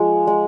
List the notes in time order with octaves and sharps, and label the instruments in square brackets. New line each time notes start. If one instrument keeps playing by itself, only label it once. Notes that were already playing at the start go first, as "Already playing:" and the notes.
Already playing: [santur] F3 G#3
G#3